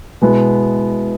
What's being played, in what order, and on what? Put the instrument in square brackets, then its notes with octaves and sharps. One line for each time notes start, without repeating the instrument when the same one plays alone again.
[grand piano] B2 G#3 B3 E4